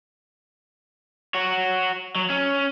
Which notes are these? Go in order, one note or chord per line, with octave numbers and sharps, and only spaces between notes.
F#4 C#5
F#3
C#4